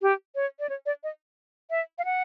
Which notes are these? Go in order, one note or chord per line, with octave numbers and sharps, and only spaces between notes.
G4
C#5
D5
C#5
D5
D#5
E5
F5
F#5